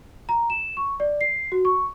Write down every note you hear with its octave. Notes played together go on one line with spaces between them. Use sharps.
A#5
E7
C#6
D5
C7
F#4
C#6